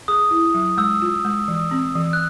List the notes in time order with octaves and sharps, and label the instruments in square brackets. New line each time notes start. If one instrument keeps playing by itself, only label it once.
[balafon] G#4 [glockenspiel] D#6
[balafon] E4
F#3
[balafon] G#3 [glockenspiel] E6
[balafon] F4
G#3
E3
C4
E3
[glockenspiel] F#6